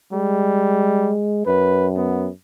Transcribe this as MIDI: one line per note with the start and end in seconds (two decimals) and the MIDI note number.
0.13 1.13 55
0.13 1.45 56
1.46 2.30 42
1.46 1.88 71
1.97 2.29 59